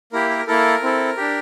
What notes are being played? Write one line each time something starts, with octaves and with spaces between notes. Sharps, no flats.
A#3 E4 G4 A#4
A#4
A#3 E4 A4 A#4
C4 E4 A4
D4 G4